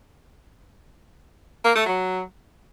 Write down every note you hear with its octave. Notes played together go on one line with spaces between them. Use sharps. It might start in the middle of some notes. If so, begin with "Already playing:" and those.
A#3
A3
F#3